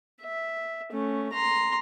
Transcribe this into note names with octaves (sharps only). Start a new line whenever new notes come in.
E5
A3 C#4
A#5 C6